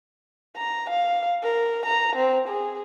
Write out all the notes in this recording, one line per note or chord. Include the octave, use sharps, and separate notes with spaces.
A#5
F5
A#4
A#5
C4
G#4